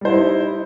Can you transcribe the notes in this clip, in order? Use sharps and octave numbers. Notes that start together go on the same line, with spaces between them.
G3 D#4 E4 C5